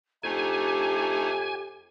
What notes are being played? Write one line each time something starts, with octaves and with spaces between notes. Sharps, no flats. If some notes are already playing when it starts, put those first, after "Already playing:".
F2 A3 D4 D#4 G4 G#5